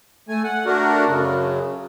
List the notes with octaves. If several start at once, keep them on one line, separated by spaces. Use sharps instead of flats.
A3 G#5
F#5
A3 D4 F#4 A#4
F#2 C#3